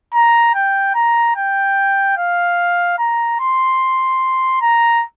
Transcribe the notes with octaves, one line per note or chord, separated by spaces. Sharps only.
A#5
G5
A#5
G5
F5
A#5
C6
A#5